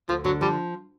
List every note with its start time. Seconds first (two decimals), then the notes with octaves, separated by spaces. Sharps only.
0.09 D2 F3
0.24 D3 F#3
0.41 F3 G3